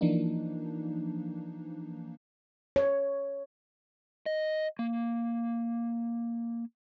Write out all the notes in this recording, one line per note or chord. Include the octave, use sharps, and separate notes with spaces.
E3 F3 A#3 D4 D#4
C#5
D#5
A#3